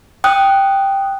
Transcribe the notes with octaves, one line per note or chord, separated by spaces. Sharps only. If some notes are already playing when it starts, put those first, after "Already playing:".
G5 D#6 F#6